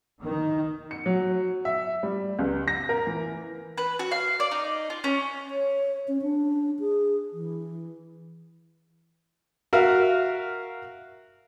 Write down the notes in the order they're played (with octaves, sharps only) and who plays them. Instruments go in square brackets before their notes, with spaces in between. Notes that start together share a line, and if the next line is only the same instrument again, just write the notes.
[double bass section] D#3
[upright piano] C#7
F#3
E5
G3
C#2
A#6
A#4
E3
[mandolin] B4
F#4
F5
D5
D#4
F4
C#4
[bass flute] C#5
C#4
D4
G#4
E3
[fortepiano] F#4 A#4 E5 F5